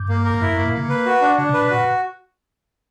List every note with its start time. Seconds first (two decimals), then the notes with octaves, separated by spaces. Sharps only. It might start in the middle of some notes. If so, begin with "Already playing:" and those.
Already playing: G2
0.09 A#3
0.25 A#4
0.34 G2
0.41 F#2 E4
0.53 F#2 A#3
0.66 A#2
0.73 C#3 A#3
0.89 B4
1.06 F#4
1.21 D4
1.38 C#3 D4
1.49 B2
1.54 B4
1.62 B2
1.71 A#2 F#4